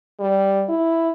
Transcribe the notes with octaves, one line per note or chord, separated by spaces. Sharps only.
G3
E4